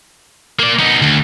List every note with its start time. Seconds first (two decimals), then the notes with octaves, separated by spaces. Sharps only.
0.59 A#3 D5
0.79 B3 D#4
1.02 D2